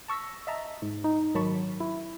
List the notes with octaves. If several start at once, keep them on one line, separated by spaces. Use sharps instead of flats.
A5 C#6 E6 A#6 B6
D#5 E5 A5 A#5
G#2
D#4
G#2 D#3 F#3 A5 B5 C#6
E4